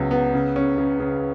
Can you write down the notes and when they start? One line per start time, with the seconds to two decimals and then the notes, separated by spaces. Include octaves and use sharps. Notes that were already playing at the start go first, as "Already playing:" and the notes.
Already playing: C#2 F#3 B3
0.11 B3
0.34 C#3
0.56 C#4
0.78 C#3
1.00 C#3